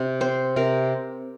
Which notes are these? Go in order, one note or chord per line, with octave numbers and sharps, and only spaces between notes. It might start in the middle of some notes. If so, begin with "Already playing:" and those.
Already playing: C3
C4 C5
C3 A#4